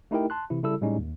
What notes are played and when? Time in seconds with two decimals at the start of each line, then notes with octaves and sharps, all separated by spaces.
0.11 A3 D#4 E4 G4 A#4 G5
0.30 A5 C6 F#6
0.50 C3 E3 E4
0.63 C#3 G3 E4 A4 E6
0.81 A2 G3 G#3 C#4 D#4
0.98 D#2